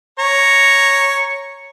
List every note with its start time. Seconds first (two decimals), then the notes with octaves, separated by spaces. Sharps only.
0.19 C#5 A#5